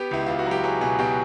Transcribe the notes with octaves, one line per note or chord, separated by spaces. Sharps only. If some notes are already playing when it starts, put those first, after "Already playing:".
Already playing: B3 G4
C#2 E4
C#2 F4
F#4
F#3
G4
F#3 G#4
B2 G#4
B2 G4